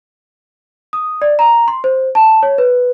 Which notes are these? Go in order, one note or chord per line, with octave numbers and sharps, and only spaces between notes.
D#6
D5
A#5
C6
C5
A5
C#5
B4